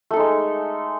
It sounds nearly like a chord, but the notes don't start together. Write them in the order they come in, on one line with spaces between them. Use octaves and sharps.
A3 A4 D#4 G#3